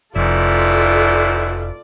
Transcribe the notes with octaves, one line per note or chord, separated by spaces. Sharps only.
F1 G#2 B2 E4 F4 A4 D5